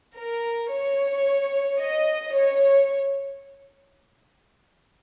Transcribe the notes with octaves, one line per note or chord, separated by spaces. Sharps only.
A#4
C#5
D#5
C#5